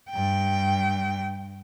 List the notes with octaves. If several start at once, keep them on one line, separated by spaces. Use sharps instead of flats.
G2 G5